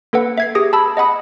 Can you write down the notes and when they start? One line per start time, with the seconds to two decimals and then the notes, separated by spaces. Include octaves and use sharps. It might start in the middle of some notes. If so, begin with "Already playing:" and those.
0.13 A#3 A4 B4 F#5
0.38 E5 G#6 C7
0.55 G4 G#4 D#6 A#6
0.73 A5 B5 E6
0.97 D#5 F#5 B5 D#6